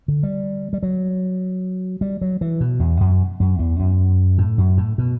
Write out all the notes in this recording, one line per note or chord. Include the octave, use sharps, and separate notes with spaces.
D3
G3
G3
F#3
G3
F#3
E3
B2
E2
F#2
F#2
E2
F#2
A2
F#2
A2
B2